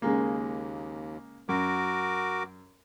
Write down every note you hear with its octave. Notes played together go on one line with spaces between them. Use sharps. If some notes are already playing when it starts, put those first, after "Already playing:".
D#2 C#3 G#3 A#3
F#2 F#4 A#4 D6